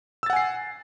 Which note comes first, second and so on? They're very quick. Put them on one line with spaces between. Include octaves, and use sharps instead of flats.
E6 A6 F#5 G#5 C7